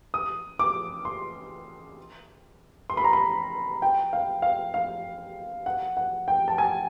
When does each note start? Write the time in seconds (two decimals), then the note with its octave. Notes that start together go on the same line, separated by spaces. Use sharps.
0.14 D#6
0.59 D6
1.05 C6
2.90 C6
2.97 B5
3.04 A#5
3.13 B5
3.82 G5
4.13 F5
4.42 F5
4.74 F5
5.66 F#5
5.97 F#5
6.28 G5
6.48 A5
6.58 G#5